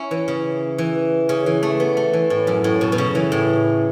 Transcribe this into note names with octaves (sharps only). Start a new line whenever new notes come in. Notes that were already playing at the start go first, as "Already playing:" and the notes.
Already playing: C#4 E4
E3
C#3
E3
C#3
E3
A3
B3
A3
E3
A2
F#2
A2
B2
B2
C#3
E3
A2